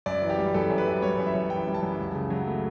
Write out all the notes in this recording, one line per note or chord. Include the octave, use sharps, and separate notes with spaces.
F#2 D5
E3
G4
G3
F#2 A4
F#2
B4
E3
G3 C#5
F#2
E5
F#2
E3 G5
G3
A5
F#2
C#2
C#3
F#3
A3